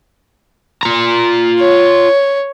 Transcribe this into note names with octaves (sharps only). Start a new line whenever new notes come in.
F4 A#5
C#5